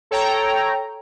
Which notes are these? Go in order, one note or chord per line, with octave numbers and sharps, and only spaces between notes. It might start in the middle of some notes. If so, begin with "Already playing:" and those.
A4 C#5 G5 A#5